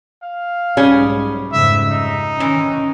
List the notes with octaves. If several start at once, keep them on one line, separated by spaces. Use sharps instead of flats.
F5
B1 G#2 G3 C#4 G#4
F2 G#2 C#3 E5
D#4
D#3 E3 C#4